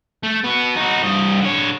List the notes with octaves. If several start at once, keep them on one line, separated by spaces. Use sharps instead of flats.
A3
B3 F#4
D#4 F#4
G2 D#5
D3 C#5